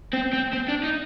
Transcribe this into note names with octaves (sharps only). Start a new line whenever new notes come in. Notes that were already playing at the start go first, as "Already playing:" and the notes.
C4
C4
C4
D4
D#4